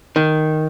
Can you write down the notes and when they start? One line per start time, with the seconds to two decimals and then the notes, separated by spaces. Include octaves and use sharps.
0.16 D#3